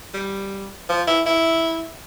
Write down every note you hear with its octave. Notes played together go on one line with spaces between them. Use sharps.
G3
F3
E4
E4